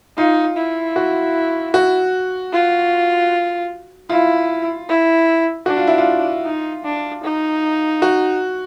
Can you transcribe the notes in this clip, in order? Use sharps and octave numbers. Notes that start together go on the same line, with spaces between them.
D#4 F4
E4
F#4
F#4
F4
E4 F4
E4
D4 F#4
F4
E4
F4
D#4
D4
D#4
F#4